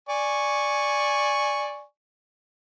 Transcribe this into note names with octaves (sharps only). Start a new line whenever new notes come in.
D5 G#5 C#6